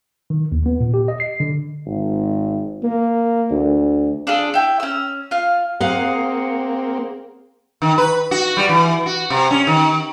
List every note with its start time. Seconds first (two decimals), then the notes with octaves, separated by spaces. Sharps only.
0.30 D#3
0.52 D#2
0.66 B3
0.80 A#2
0.94 G4
1.08 D#5
1.20 C7
1.40 D3
1.86 G#1
2.83 A#3
3.50 D2
4.27 D4 F4 G#4 A4
4.54 E4 G5
4.80 C#4 E6
5.31 F4 F5
5.80 A#3 C4 G#4 F5 F#5
7.82 D#3
7.98 B4
8.31 F#4
8.57 G3
8.69 E3
9.06 F#4
9.30 C3
9.51 C#4
9.67 D#3